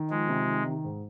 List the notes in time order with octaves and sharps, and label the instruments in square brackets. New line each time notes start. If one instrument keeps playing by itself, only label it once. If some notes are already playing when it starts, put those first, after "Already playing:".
Already playing: [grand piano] D#3
[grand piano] F3 [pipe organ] G#3
[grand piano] C3
D#3
D#3
G#2